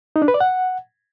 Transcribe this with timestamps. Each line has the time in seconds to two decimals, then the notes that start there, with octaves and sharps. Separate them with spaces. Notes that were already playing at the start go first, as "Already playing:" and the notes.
0.16 D#4
0.22 D4
0.28 B4
0.34 D5
0.40 F#5